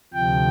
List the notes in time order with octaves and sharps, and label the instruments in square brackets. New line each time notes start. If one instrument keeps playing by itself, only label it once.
[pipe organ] D2 C3 F3 G5